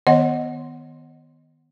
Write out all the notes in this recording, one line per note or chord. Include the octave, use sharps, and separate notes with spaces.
D#3 B3 C#5 D#5 F#5